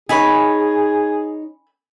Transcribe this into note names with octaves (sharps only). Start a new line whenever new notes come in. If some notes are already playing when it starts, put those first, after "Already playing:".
D#4 G#4 C#5 G#5 B5